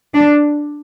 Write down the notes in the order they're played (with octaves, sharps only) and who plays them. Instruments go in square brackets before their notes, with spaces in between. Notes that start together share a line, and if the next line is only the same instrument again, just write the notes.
[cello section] D4